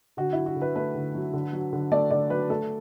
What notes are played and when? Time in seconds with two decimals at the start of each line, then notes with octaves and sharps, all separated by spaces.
0.17 D3 F#4
0.33 F#3 E4
0.46 F#4
0.56 D3
0.62 B4
0.76 A3 B4
0.95 D3
1.15 F#3
1.33 D3
1.53 F#3
1.73 D3
1.92 A3 D5
2.11 D3 D5
2.30 F#3 B4
2.50 A3 A4